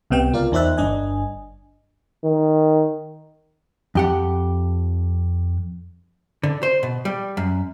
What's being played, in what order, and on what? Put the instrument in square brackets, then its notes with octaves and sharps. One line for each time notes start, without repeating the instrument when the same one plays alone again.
[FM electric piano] C2 C3 B3 G5
C#2 F4 A#4 D5 F5
E2 D#4 C5 D5 E5 F#6
G1 G2 D4 D#5 G#5
[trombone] D#3
[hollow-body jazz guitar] F2 G4 F#5
D3
C5
B2
G3
F#2